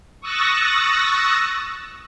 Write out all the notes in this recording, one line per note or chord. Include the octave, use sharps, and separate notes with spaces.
C#6 D#6 E6 F#6 A6 A#6